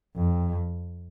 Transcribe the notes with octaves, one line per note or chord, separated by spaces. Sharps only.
F2